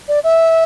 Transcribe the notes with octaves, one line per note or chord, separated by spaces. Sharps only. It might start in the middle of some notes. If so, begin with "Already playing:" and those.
D5
E5